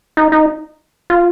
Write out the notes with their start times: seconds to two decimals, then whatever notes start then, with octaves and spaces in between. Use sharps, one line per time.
0.17 D#4
0.32 D#4
1.10 F4